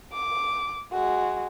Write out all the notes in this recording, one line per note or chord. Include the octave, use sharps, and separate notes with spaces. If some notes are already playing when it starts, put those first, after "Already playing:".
D6
G#3 F#4